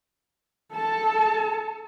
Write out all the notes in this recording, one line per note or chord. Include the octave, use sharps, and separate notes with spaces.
A4 A5